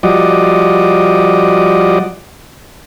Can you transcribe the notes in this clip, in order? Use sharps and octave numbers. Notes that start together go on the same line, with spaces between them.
F3 G3 F#4 D5 D#5